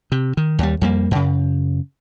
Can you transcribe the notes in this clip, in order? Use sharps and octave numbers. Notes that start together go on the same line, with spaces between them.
C3
D#3
D#2 G3
F2 G3 A#3
F#2 C#3